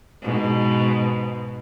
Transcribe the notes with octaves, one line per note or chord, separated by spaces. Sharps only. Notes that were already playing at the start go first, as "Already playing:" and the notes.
G#2 B2